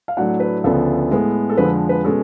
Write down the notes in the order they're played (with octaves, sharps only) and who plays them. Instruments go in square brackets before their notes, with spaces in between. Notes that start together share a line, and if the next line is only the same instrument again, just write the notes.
[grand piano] F5
A2 F#3 A3 D4 F#5
B4
D2 C#3 F3 B3 D4 A4
A2 G#3 B3
A4
F2 D3 F3 G#3 B4
B4
B2 G#3 C#4 A4